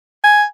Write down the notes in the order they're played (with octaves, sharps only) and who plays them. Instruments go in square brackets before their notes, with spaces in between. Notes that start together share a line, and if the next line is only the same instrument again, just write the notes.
[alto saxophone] G#5